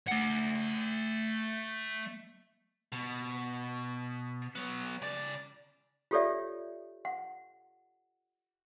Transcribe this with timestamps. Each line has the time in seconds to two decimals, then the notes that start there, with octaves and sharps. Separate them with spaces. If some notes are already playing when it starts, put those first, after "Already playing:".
0.07 A3 F#5
2.92 B2
4.55 F#3 B3
5.02 C#3 D5
6.11 F4 G4 A4 C#5 D5 E5
7.05 F#5